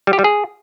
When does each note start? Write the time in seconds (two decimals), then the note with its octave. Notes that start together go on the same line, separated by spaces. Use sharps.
0.07 G3
0.13 G4
0.19 G3
0.24 G#4